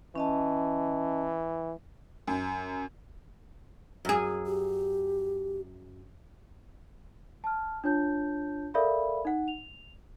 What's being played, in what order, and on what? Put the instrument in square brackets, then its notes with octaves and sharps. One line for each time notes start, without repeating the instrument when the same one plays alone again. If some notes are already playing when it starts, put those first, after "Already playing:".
[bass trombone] E3 [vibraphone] C#4 D#5 A5
[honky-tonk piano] F#2
[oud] F#2 G#4
[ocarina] G4
[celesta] A5 F6
D4 F4 C#5 A5 G6
A4 A#4 D5 E5 F5 B5
D#4 F#5
F7